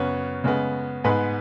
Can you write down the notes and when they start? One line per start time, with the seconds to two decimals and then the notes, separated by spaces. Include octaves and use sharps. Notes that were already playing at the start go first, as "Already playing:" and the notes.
Already playing: F#2 C#3 B3 C#5
0.44 C#3 G#3 B3
1.04 G#2 G#3 B3 B4